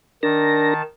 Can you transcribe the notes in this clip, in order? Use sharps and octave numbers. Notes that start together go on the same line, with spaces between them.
D#3 D4 A#4 A5 A#6